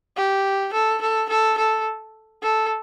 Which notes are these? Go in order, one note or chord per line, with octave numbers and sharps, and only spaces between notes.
G4
A4
A4
A4
A4
A4